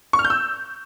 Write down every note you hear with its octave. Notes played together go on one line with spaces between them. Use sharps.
C#6
F6
G6
E6